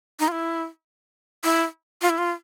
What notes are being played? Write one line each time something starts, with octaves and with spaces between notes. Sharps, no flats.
D#4
F4
E4
E4
F4
E4
F4